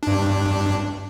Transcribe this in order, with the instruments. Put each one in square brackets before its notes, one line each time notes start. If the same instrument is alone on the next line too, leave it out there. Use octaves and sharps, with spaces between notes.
[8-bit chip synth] G2 D4